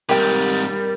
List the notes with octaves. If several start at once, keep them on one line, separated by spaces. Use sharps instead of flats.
G#2 C3 G3 G4 A#4 G5